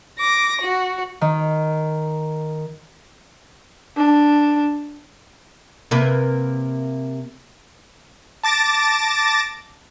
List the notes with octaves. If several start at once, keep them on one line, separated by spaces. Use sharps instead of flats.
D6 A#6
F#4
D#3
D4
C3 A#3 B4
A5 D6 A6 A#6